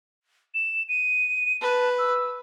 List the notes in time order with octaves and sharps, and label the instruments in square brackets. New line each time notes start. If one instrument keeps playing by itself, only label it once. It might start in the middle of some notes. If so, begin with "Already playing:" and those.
[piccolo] E7
D#7
[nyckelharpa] B4 [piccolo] A5
[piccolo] E6